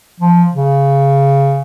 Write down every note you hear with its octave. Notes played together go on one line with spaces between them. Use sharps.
F3
C#3